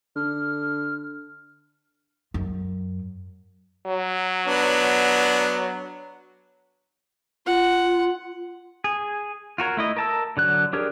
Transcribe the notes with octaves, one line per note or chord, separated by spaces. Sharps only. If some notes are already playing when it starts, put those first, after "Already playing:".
D3 F6
F#2
F#3
B3 D4
F4 F#5
G#4
F4 F#4 A#4 C#5
A3 E4 D#5
A#4 A5 E6
D3 F#3 F#6
D4 G4 G#4 A#4 C#5